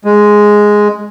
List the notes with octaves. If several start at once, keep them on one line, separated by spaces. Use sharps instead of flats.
G#3